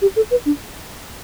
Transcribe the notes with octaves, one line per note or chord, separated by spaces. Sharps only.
G4
A4
B4
D4